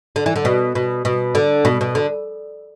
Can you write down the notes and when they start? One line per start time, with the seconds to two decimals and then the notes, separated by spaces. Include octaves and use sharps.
0.16 D3
0.26 E3
0.36 D3
0.45 B2
0.75 B2
1.05 B2
1.35 D3
1.65 B2
1.81 B2
1.95 D3